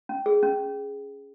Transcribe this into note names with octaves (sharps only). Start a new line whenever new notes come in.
C#4
G#4
C#4